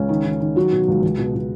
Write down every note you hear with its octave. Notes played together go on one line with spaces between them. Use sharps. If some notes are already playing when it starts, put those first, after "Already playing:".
Already playing: C#2 C#4
D#3
D#3
D#3
F#3 F#4
B2
C#2
C#2
B2
B2